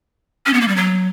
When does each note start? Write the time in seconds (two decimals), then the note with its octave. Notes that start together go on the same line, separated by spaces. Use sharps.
0.46 C#4
0.53 B3
0.61 A#3
0.68 G3
0.76 F#3